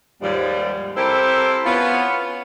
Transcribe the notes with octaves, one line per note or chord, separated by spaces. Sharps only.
D#2 G#2 F3 G3
C4 E4 G4 A4 A#4 C5
B3 C#4 F4